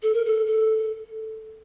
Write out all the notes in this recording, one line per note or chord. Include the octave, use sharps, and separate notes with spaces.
A4
A#4
A4
A4